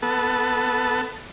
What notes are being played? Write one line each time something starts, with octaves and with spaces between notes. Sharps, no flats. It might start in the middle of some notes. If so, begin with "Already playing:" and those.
B3 A4